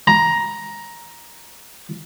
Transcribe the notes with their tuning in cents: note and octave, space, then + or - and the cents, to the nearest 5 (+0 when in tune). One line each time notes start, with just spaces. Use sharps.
A#5 +10